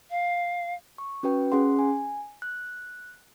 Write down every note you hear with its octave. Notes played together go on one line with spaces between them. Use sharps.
F5
C#6
C#4 F#4 B4 G5
C#4 G#4 F#5 C6
G#5
F#6